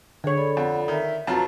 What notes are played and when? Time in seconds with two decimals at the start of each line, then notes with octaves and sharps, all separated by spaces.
0.24 D3 G#4 C#5
0.37 A4 D5 B5
0.57 F2 F#5
0.88 D#3 E5
1.27 F2 F#3 F4 F#4 B4 A5 A#5